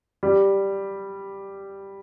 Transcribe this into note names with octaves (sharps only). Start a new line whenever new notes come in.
G3